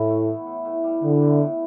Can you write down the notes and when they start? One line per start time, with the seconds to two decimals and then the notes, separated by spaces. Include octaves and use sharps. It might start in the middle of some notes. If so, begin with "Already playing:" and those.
Already playing: A2 E3 E4 A4
0.08 A3
0.27 B3
0.46 A2
0.65 A2
0.84 G3
1.02 D3 B3
1.21 A2
1.40 A2